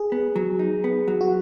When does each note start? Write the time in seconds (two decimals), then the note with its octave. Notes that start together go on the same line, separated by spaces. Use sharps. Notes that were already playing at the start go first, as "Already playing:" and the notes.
Already playing: G#4
0.12 B3
0.36 F#3
0.59 D#4
0.84 B3
1.08 F#3
1.21 F#4